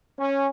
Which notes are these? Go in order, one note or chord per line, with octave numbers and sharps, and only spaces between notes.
C#4